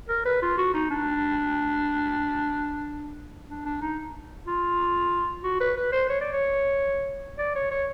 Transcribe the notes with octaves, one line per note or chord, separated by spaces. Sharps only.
A#4
B4
F4
F#4
D#4
D4
D4
D4
D#4
F4
F#4
B4
B4
C5
C#5
D5
C#5
D5
C#5
C#5